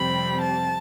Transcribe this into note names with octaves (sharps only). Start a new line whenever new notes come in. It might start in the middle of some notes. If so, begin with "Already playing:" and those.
Already playing: F2 C3 G3 C4 B5
A5